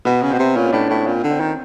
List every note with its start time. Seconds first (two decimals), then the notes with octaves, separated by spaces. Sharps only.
0.05 B2 B3
0.22 C#3
0.30 B2 C4
0.39 C3
0.56 A#2 C#4
0.66 C#4
0.73 A2 D4
0.90 A2 C#4
1.06 A#2 C4
1.23 D3
1.31 C4
1.40 D#3